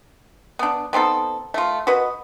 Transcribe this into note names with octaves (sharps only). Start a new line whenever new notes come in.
B3 D4
B3 C4 D#4 A4
A3 F4
F#4 B4 D#5